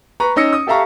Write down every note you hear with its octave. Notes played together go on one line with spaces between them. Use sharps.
B4 A#5 C#6
C#4 D#4 E6 A#6 C#7
D#6
G4 A4 E5 F5 A#5 C#6